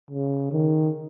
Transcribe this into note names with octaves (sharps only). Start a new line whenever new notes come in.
C#3
D#3